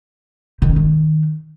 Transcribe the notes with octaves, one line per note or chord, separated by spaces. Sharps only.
D#3
C#4
D#3